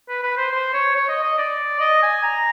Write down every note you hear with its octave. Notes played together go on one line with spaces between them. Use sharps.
B4
B4
C5
C5
C#5
C#5
D#5
D#5
D5
D#5
G#5
A#5